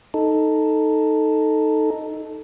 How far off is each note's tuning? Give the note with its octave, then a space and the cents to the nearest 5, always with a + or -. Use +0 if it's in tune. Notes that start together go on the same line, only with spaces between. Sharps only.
D#4 +0 A4 +0